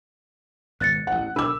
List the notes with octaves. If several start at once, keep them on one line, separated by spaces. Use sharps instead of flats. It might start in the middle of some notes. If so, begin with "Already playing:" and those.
G#1 B2 F#6 A6 C#7
A1 E2 F#5
B1 D3 D4 A#4 B5 D6 E6